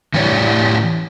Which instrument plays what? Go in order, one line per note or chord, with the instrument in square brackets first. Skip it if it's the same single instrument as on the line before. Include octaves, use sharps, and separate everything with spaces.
[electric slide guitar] A2 E3 G4 C#5 D5